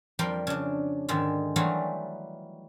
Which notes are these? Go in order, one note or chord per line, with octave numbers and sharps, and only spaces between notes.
F2 F3 G3 A#4 G5
C#3 D4
G#2 D3 D#3 G#3
E3 F#3 G3 A3 D#4 F4